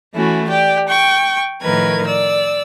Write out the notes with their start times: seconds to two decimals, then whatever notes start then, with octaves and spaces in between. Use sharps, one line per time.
0.14 E3 A3 C#4 E4 F#4
0.49 G4 D5 G5
0.89 G5 C#6
1.61 A2 D#3 F3 A#4 B4 G#6
2.06 D5 E6